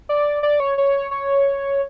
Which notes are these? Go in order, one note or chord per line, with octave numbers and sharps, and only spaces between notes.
D5
D5
C#5
C#5
C#5